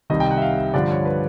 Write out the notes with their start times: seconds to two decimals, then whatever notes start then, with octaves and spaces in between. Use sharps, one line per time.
0.10 C2 C3 D#3 D#5
0.20 G5
0.31 F#5
0.37 E5
0.42 F5
0.58 E5
0.74 G2 D3 F3 D5
0.90 C#5
1.05 B4